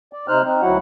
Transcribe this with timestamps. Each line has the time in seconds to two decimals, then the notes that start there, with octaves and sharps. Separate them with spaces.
0.13 D5
0.28 C3 D#4 C5 F6 F#6
0.44 C4 D#4
0.62 D2 F#3 E4 F#4 F#5